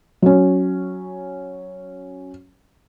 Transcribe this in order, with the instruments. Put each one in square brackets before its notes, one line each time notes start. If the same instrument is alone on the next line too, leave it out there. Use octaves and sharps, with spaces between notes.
[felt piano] F#3 C#4